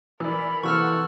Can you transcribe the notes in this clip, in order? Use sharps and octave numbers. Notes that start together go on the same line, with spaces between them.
E3 A#4 D5 B5
C3 E3 A#3 A4 F#5 C#6 E6 F6